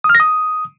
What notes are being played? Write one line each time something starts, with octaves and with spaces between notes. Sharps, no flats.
D#6
F6
A#6
D#6